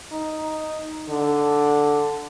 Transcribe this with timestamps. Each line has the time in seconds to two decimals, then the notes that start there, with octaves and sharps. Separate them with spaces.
0.12 D#4
1.09 D3